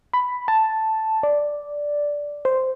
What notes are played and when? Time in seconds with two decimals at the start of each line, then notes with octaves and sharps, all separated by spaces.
0.13 B5
0.48 A5
1.23 D5
2.45 C5